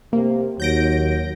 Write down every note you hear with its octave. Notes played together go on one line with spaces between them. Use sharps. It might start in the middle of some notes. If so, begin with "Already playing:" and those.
C3 A#3
D#2 F#3 G6 A#6 D7